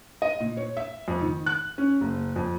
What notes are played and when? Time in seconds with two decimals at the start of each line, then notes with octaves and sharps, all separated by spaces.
0.22 D#5
0.40 A#2
0.57 C#5
0.77 E5
1.08 F2
1.21 D#3
1.46 F#6
1.78 C#4
2.01 F#1
2.36 F2